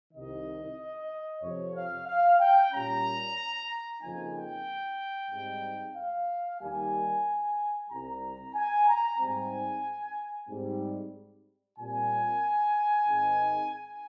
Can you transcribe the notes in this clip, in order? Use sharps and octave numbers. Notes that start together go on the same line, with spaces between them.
C2 C3 D#3 D#5
F2 C3 F3 C#5
F5
F5
G5
A#2 G3 C#4 A#5
F2 C#3 F3 A#3 D#4 G#5
G5
G#2 G3 C4 D#4
F5
D#2 D#3 G3 A#3 G#5
C2 C3 G3 A#5
G#5
A#5
G#2 G3 C4 G#5
G#2 G3 C4
A#2 G3 C4 G#5
G#2 D#3 G#3 C4 D#4
G#5